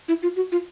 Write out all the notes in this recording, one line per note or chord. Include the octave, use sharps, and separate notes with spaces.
E4
F4
F#4
F4